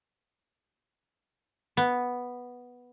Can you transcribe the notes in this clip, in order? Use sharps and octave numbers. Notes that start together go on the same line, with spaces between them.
B3